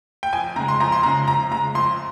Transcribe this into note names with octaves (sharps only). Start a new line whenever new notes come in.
G5
F2 G#5
C#3 G#3 A#5
C6
F2 A#5
C6
C#3 G#3 A#5
F2 A#5
C#3 G#3 A#5
F2 C6